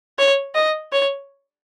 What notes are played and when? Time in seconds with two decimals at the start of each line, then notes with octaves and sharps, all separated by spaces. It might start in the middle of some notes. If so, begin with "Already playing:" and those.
0.19 C#5
0.55 D#5
0.93 C#5